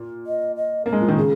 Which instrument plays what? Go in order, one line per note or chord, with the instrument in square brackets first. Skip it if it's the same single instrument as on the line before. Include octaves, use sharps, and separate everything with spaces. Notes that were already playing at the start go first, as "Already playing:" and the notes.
Already playing: [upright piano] A#2
[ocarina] D#5
D#5
[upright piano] A#3 [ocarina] A#4
[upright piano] G#3
F3
D#3
[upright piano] C#3 [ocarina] G#4